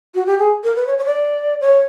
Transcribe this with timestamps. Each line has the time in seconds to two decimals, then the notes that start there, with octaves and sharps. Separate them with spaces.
0.15 F#4
0.26 G4
0.39 G#4
0.64 A#4
0.76 B4
0.87 C#5
0.98 C#5
1.05 D5
1.61 C#5